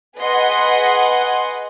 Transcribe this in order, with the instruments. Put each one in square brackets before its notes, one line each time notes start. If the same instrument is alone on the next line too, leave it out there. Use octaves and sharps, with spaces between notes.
[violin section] G#4 B4 D#5 F#5 C6